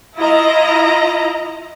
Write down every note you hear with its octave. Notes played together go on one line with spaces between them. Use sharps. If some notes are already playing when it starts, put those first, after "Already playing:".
E4 F4 D#5 A#5